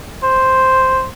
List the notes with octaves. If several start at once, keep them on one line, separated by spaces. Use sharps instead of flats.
C5